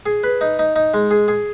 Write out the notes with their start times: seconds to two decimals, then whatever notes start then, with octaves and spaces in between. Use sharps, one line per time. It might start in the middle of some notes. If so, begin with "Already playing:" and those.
0.06 G#4
0.24 B4
0.41 D#4
0.59 D#4
0.76 D#4
0.94 G#3
1.11 G#4
1.28 G#4